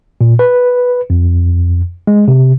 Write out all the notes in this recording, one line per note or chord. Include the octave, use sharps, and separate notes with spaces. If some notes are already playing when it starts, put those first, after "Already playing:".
A#2
B4
F2
G#3
C3